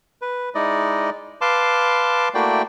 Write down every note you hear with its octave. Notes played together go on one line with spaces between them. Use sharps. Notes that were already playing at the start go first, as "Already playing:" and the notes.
B4
G#3 D#4 E4 D5 D#5
B4 F5 A5 C6 D6
A3 A#3 E4 F#4 D5 G5